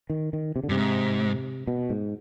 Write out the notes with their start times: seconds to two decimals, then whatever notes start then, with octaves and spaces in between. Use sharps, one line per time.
0.10 D#3
0.33 D#3
0.56 C3
0.64 D3
0.69 G2 C3
0.77 G#2
1.67 B2
1.90 G#2